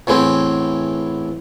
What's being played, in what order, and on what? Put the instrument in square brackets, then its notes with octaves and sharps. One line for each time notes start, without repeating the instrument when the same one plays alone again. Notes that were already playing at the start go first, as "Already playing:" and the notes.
[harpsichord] E2 A2 E3 C4